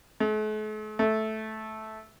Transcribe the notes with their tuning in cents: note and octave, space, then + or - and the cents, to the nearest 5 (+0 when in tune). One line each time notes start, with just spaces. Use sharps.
A3 -45
A3 -10